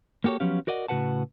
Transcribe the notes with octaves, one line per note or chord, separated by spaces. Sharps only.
A#3 F#4 G4 A4 C#5
F3 F#3 B3 C#4 G4 F5
F#4 A#4 D5 D#5 F#5
A2 C#3 F#4 B4 F#5 A5